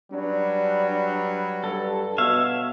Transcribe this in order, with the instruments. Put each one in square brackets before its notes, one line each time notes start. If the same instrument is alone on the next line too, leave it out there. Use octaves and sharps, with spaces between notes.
[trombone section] F#3 G3 B4 [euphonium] D4
[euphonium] G2 [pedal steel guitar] A4
[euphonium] B2 [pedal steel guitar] C#5 E5 F5